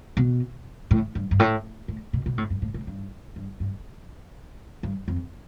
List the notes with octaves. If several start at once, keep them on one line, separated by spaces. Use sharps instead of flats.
B2
A2
G2
G2
A2
A2
B2
B2
A2
G2
A2
A2
G2
G2
G2
G2
F2